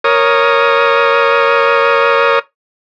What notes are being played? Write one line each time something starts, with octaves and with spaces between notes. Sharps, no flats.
A#4 C#5 D#6